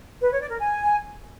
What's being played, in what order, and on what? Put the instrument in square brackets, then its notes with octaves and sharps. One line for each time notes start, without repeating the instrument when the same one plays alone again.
[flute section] B4
C#5
D5
A#4
G#5